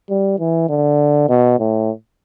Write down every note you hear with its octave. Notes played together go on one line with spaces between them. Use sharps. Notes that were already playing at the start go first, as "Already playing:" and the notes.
G3
E3
D3
B2
A2